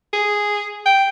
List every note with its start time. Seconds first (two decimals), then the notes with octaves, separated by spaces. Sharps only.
0.13 G#4
0.86 G5